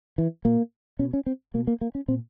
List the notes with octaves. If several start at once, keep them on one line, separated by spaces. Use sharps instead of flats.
E3
A#2 A#3
B2 C#4
C#4
C4
B2 A#3
A#3
A#3
C#4
A#2 C4